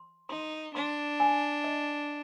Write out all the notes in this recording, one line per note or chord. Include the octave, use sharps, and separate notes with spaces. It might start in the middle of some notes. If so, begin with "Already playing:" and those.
Already playing: C6
D#4 C6
D4 C6
G#5
D#5